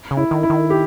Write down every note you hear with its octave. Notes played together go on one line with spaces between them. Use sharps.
C#3
E4
D#3
E4
D#3
G4